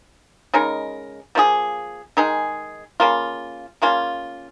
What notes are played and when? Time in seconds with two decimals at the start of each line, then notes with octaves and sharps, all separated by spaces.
0.54 C#3 G#3 D#4 A#4
1.35 F3 A#3 F4 G#4
2.17 D#3 G#3 D#4 G#4
3.00 C#3 A#3 F4
3.82 C#3 A#3 C#4 F4